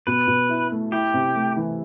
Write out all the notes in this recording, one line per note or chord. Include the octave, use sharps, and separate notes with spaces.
B2 B4
B2
E4
A3
E4 G4
C3
A3
E3